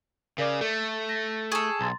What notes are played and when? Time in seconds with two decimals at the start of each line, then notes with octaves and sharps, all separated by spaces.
0.38 C#3 A#4 D5 D6
0.61 A3 A4
1.09 A#6
1.52 G#4 A4 C#6
1.81 B1 A#5 C6 A6